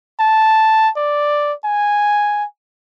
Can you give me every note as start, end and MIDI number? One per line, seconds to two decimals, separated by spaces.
0.20 0.89 81
0.96 1.53 74
1.65 2.45 80